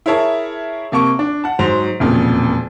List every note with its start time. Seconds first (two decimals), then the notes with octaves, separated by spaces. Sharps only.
0.06 E4 G#4 A#4 C#5 E5 A5
0.92 C3 A#3 A5 C#6
1.19 D4
1.44 F#5 A5
1.59 G#2 F#3 C5 F7
2.00 E1 F2 A#2 C#3